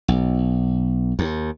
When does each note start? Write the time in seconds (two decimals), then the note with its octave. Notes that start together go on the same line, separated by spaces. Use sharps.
0.08 B1
1.19 D#2